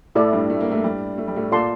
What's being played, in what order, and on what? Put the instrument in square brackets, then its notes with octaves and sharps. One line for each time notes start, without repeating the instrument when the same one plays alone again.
[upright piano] A2 A3 [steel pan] E4 A4 D5
[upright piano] G2 G3
A3
A#3
A2 A3
G2 G3
A3
G3
A2 A3
[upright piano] A#2 A#3 [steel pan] F4 A4 D5 A5 C6